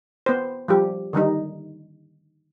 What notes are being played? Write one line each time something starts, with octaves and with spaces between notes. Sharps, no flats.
B3 C5
F3 G3 G4
D3 D#3 G3 D#4